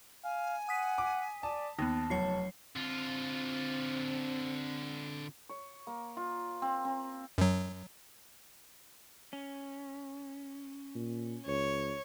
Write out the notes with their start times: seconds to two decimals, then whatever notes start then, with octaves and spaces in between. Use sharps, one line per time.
0.24 F5 G#5
0.69 F#5 D#6 B6 D#7
0.98 D6
1.43 D5 A5
1.79 D#2 B3 D#4 A5
2.10 F1 F#3 C#5 C7
2.76 D3 C4 F4
5.49 C#5
5.87 A#3
6.17 F4
6.62 C4
6.85 C4
7.38 F#2 F#3
9.33 C#4
10.95 A#2
11.47 C#2 C#5